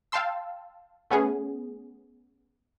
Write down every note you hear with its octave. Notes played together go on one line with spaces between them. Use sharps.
F5 G5 A5 C6 E6
A3 B3 C#4 G#4